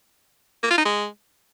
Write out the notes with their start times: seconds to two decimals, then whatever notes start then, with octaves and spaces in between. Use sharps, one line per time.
0.63 A#3
0.70 F4
0.78 D#4
0.85 G#3